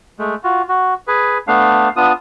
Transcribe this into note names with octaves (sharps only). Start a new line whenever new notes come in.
G#3 A3
F4 F#4
F#4
G#4 B4
A3 B3 D4 F5
B3 D4 F4 D#6